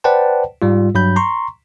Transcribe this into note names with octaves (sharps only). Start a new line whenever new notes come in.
B4 C5 D5 F#5 G5 A5
G#2 G3 F4
G2 F#3 B5 G6
A#5 C6 C#6